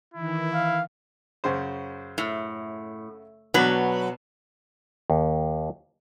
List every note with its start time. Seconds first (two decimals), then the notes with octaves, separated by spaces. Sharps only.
0.14 D#3 E3 E4
0.54 F5
1.44 F#2 C#3 C5
2.18 A2
3.54 B2 F#3 B3 D4 B4
5.10 D#2